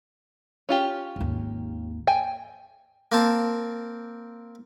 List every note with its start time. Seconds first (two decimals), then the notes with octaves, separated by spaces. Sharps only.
0.69 C#4 F4 G4
1.16 G#1 D#2
2.07 G5 G#5
3.12 A#3 C4 A5